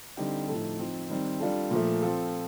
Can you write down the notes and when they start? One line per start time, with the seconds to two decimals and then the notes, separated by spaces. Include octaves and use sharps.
0.17 D3 G3 C4 D#4 G4
0.48 A2 F3 A3 D#4 A4
0.79 F3 C4 D#4
1.10 D#3 G3 C4
1.40 G3 D4 F4 A4
1.71 A#2 F3 A3
2.02 F3 C4 F4 A4